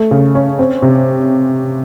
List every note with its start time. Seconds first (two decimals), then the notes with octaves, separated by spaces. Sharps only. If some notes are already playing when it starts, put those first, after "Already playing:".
Already playing: A3
0.11 C#3
0.35 C#4
0.59 C4
0.82 C3